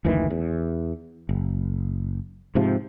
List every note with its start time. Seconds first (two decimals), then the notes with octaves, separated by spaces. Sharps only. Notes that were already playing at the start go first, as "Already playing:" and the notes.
0.05 F#1 D2 D#3 E3
0.30 E2
1.29 F#1
2.55 G#2 C3 F3